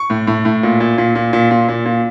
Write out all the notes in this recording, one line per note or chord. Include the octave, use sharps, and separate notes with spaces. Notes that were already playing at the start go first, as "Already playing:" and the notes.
Already playing: C#6
A2
A2
A2
A#2
A#2
A#2
A#2
A#2
A#2
A#2
A#2